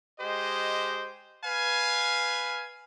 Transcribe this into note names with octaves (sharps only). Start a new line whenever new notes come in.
G#3 G4 C5 D#5
B4 F5 G#5